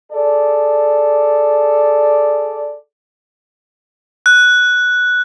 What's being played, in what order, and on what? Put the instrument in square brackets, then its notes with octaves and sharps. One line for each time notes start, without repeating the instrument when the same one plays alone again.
[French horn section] G#4 A4 D5
[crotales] F#6